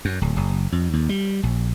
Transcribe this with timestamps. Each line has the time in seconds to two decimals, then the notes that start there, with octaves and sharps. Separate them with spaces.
0.05 F#2
0.22 D1
0.37 F#1
0.72 F2
0.93 D#2
1.09 G3
1.43 A#1